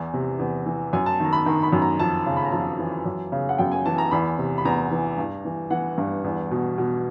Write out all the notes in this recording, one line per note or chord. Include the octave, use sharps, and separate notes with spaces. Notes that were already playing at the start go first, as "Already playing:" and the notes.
Already playing: E2 E3
C3
E2
E3
F#2 G#5
A5
D#3 A#5
B5
D#3 A#5
B5
F#2
A#5
F2 A5
C#3
B5
A#5
F2 A5
E3
F#2
C#3
F#5
F#2 G5
G#5
E3 A5
A#5
E2 B5
C3
B5
E2 A#5
E3
G2
E3
E3 F#5
G2
E2
B2
B2